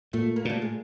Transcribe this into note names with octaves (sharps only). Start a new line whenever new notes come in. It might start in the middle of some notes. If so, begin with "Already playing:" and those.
A#2 A3
A#3
A#2 A3
G#3